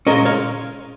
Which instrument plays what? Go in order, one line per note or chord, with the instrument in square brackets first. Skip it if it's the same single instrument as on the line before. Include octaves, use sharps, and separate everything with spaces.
[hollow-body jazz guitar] A#2 G#3 C#4 A#4 D#5
C#5 F5